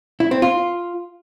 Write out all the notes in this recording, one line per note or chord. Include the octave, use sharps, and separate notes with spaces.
E4
C4
F4